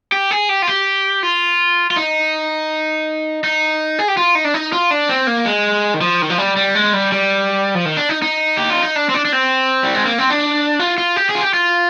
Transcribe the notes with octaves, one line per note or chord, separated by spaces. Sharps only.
G4
G#4
G4
F4
G4
F4
F4
D#4
D#4
G#4
G4
F4
D#4
D4
D#4
F4
D4
C4
A#3
G#3
D#3
F3
D#3
F3
G3
G3
G#3
G3
G3
F3
D#3
D4
D#4
D#4
G4
F4
D#4
D4
C4
D4
D4
C4
G3
G#3
A#3
C4
D4
F4
F4
G4
G#4
F4
G4
F4